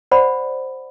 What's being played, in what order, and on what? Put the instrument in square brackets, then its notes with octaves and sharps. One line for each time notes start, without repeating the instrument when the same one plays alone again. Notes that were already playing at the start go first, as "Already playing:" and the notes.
[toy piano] C5 D5 F#5 B5